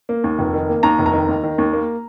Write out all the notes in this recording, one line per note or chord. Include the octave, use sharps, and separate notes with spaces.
A#3
D#2
F1
D#3
A#3
D#2 A#5
F1
A#5
D#3
D#2
D#3
D#2
A#3